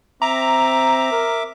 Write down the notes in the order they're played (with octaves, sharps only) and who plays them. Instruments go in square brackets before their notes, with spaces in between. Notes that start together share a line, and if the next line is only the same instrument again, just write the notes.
[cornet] C4 [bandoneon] E5 D6 [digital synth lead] A#5
[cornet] A#4